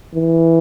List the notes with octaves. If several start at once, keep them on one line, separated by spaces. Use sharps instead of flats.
E3